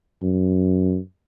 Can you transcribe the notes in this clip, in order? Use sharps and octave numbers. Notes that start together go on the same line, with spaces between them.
F#2